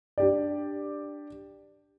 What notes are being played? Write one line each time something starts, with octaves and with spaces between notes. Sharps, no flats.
D4 G4 D5